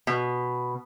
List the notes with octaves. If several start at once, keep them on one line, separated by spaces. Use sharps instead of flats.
B2